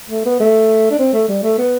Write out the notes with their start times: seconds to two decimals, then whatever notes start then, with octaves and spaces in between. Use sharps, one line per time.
0.10 A3
0.25 B3
0.40 A3
0.91 D4
0.99 C4
1.13 A3
1.28 G3
1.43 A3
1.58 B3